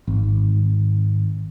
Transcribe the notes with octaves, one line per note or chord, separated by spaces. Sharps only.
G#1